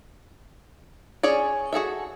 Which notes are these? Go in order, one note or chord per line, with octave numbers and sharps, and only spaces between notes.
C#4 G#4 C#5 D5
F#4 G#4 A4 E5